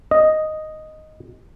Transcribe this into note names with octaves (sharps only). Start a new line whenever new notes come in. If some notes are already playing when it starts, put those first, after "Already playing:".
D#5